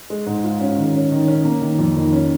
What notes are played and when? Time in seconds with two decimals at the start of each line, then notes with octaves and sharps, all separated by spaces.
0.10 G#3
0.26 G#2
0.44 F4
0.60 C#4
0.78 D#3
0.94 C#4
1.11 D#3
1.28 C#4
1.45 A#3
1.61 D#3
1.79 F2
1.96 D#3
2.12 C#4